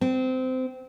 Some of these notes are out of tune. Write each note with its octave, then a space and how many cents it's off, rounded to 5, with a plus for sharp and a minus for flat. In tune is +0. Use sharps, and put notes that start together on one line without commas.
C4 -20